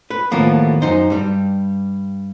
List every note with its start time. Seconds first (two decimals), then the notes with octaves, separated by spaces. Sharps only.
0.10 B4
0.31 D#2 A2 E3 F3 A#3 B3
0.82 F#2 D#4 C5
1.10 G2 G3